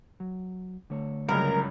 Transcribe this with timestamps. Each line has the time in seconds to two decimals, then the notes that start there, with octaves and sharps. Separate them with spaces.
0.20 F#3
0.90 D3 A3 C#5
1.29 C#2 G2 C#3 F#3 A#4